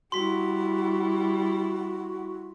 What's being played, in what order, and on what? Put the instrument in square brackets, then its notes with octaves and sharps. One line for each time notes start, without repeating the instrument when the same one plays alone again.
[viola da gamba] G3 E4 [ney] F#4 [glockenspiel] C6 B6